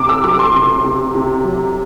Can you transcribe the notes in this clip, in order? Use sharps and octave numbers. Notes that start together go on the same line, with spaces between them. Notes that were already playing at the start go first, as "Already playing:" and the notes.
Already playing: C3 D6
E6
F#3 D6
C6
C3
C3
C3
F#3